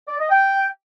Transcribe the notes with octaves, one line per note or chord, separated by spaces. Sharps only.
D5
D#5
G5